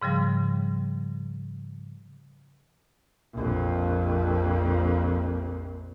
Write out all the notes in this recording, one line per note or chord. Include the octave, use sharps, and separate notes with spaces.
G#2 C#3 F3 G3
A#1 F2